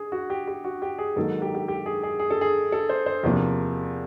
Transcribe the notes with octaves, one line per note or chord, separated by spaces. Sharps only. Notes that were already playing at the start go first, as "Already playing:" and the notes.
Already playing: G#4
F#4
G4
G4
F#4
G4
G#4
G#2 D#3 F#3 A#3 A4
G4
G4
G4
G#4
G#4
G#4
A4
G#4
A4
C5
C5
E2 C3 F3 A#3